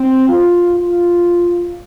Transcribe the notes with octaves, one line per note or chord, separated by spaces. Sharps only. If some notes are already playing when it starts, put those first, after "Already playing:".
Already playing: C4
F4
F4